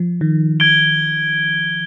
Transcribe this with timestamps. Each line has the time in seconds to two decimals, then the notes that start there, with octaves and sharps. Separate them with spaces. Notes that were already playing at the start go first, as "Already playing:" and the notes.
Already playing: F3
0.21 D#3
0.60 G#6 D7 G7